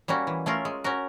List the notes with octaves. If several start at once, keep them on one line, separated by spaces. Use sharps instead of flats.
G3 A#3 C#4 F#4
E3
A3 C#4 F4 A#4
G#3
C#4 F#4 A#4